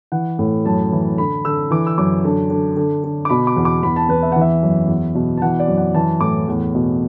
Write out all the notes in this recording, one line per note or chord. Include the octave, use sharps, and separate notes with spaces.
E3 F#5
A2
F#2 A5
E3
D3 B5
D3 E6
E3 D6
E6
F#2 D6
D3
D3
D3
D3
D6
B2 B5
D6
E2
D6
E2 B5
A5
E2 B4
E5
E3 F#5
E5
F#2
E2
B2
A5
E3 F#5
D5
F#2
F#5
E3 A5
A2 D6
E2
B2